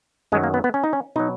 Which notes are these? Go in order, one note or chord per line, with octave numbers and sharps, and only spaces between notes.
F#2 D#3 F#3 G#3
A#3
B3
B3
C#4
D#4
C#4
B2 F#3 D#4